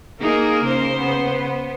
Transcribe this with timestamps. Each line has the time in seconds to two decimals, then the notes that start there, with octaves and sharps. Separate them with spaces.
0.20 A#3 D#4 G#4 A#4
0.64 C#3 C5
0.97 B3